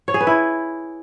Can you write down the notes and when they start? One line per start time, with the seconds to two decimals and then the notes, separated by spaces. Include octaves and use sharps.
0.08 C#5
0.14 G#4
0.21 B4
0.27 E4